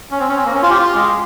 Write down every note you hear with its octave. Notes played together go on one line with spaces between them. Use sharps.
C#4
C4
C#4
C4
A#3
C#4
F4
G4
F4
G#3